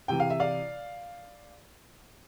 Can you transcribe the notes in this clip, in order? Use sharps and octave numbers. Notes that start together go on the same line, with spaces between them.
C3 E3 G5
F5
E5
D5 F5